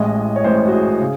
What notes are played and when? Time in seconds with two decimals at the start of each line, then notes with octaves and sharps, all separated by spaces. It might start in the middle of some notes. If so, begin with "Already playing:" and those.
Already playing: A1 A2 G#3 D#5
0.36 C#5
0.44 A1 A2 G#3 C5
0.68 F#4
0.73 G#4
1.00 C#3